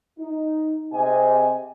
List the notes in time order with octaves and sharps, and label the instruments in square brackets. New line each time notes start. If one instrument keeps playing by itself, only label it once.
[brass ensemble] D#4
C3 C4 G4 G#4 D#5 G#5